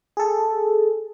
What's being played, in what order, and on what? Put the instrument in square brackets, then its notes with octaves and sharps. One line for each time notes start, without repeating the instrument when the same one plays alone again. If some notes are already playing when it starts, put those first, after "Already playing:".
[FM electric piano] G#4 A4